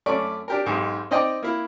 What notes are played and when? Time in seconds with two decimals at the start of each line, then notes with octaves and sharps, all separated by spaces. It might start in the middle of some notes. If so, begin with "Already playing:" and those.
0.06 F#2 A3 C#4 D5 C#6 D6
0.48 D4 G4 A#4
0.66 B1 G#2 G4
1.11 C4 D#4 D5 D#5 G5
1.42 A#3 E4